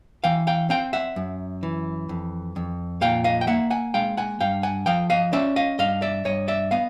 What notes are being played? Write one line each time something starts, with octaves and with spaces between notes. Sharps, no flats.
E3 F5 G5
F5 G5
C4 F5 G5
E5 F#5
F#2
E3
F2
F2
A#2 F5 G5
D#5 F5
G5
A#3 E5 F#5
F#5 G#5
G#3 F5 G5
F#5 G#5
G2 F5 G5
F#5 G#5
F3 F5 G5
D#5 F5
C#4 D5 E5
D#5 F5
G2 D#5 F5
D5 E5
G2 C#5 D#5
D5 E5
B3 D#5 F5